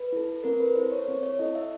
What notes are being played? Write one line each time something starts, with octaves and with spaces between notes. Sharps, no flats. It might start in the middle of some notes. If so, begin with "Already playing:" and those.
Already playing: B4
E4 A4
C4 A#4
B4
E4 A4 C5
C#5
C4 C#5
C#5
E4 A4 D#5
E5